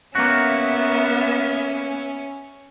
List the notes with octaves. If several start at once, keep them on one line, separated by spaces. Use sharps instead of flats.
A#3 B3 C#4 F#4 E5